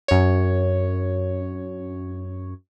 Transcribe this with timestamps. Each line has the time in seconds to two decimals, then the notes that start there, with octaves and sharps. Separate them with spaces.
0.08 F#2 C#5